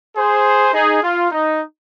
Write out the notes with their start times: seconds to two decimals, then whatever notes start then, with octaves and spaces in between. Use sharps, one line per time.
0.16 G#4 C5
0.73 D#4 G#4
1.02 F4
1.31 D#4